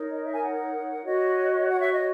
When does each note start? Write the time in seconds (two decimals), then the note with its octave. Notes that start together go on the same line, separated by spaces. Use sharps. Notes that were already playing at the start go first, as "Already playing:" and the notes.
Already playing: D#4 A#4 C#5
0.08 D#5
0.25 E5
0.34 G#5
0.41 F#5
1.04 F#4 C#5 D#5
1.68 F#5
1.81 E5
1.93 D#5